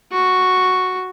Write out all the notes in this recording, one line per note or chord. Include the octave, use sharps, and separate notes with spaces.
F#4 C#6